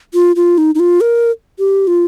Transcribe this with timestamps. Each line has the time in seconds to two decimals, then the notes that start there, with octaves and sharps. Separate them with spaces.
0.14 F4
0.36 F4
0.58 D#4
0.75 D#4
0.80 F4
1.01 A#4
1.59 G4
1.87 F4